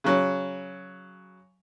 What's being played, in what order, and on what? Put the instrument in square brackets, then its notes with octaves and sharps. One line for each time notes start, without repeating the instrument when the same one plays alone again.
[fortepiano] C#3 F#3